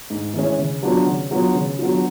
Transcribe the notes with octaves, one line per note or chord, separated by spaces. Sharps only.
G#2
E3 G#3 C#4
C#3
F#3 B3 D4 F4
C#3
F#3 B3 D4 F4
C#3
F#3 B3 D4 F4